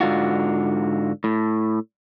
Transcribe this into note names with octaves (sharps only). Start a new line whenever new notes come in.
G#2 D3 F4 F#4
A2